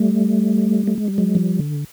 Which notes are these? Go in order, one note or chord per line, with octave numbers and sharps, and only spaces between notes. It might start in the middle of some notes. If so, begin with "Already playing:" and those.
Already playing: G3 A3
A3
G#3
G3
F#3 G#3
F3 G3
D3